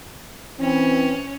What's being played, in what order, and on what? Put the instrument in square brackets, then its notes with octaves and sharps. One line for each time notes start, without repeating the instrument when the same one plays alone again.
[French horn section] E3 C4 [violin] C#4